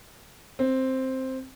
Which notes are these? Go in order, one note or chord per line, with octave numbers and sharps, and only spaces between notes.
C4